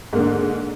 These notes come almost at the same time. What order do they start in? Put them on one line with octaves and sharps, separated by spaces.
G#2 A#3 D3